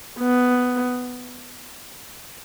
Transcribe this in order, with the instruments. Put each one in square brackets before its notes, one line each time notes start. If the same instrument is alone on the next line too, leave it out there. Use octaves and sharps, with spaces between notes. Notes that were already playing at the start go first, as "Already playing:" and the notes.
[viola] B3